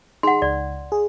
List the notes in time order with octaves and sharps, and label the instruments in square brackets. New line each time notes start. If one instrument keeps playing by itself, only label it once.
[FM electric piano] D#4 G#4 [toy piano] F#5 C6
[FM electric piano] C#2 [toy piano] D5
[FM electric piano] G#4